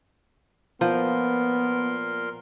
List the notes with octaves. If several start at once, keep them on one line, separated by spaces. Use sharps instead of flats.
A#2 F3 B3 A#4 C6